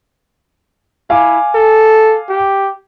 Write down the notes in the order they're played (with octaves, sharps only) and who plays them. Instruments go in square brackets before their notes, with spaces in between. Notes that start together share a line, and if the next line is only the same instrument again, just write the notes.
[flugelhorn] E4 [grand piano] F5 G#5 D6
[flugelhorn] A4
G4